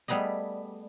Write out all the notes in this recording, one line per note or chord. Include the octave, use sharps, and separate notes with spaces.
G3 A3 B3 G#4 D#5